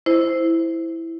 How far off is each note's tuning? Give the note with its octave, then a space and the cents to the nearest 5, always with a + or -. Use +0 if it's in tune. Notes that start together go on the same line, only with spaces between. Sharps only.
E4 +0 C5 -10